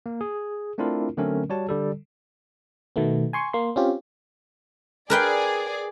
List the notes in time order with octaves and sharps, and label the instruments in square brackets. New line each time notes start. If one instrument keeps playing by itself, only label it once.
[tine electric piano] A#3
G#4
A3 C4 D4 E4 F4 A#4
D3 F#3 A3 C4 C#4 A#4
G3 F#4 C#5 A5
D3 G3 A4
[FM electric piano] B2 D#3 A3 B3
G#5 C6 C#6
A#3 C6
C4 C#4 F4 G4
[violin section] G#4 D5 [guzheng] A#4 B4 G5